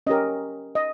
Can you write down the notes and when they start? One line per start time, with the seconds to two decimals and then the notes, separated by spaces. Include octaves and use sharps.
0.07 C#4 G4 A#4 D#5
0.75 D#5